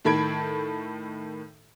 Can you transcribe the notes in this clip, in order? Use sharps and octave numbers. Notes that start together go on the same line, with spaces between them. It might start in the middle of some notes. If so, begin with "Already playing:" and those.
A2 D#3 A4 B5 G#6 D7